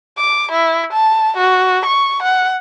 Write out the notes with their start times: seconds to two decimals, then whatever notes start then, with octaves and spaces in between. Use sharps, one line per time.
0.17 D6
0.52 E4
0.93 A5
1.37 F#4
1.86 C#6
2.23 F#5